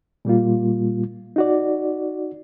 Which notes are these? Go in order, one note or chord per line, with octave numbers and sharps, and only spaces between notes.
A#2 G3 A#3 F4
D#4 F#4 D5